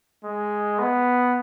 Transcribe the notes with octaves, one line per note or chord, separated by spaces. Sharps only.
G#3
B3